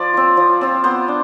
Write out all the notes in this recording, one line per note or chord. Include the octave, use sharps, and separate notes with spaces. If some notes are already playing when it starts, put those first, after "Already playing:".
Already playing: F3 D5
C4 F4
F3
C4 F4
B3 C5
D4